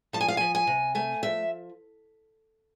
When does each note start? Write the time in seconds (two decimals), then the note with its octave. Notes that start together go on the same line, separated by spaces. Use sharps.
0.13 F3 A5
0.21 G#5
0.28 F5
0.37 F3 G#5
0.55 G#5
0.67 C3
0.95 A3 G#5
1.23 F3 E5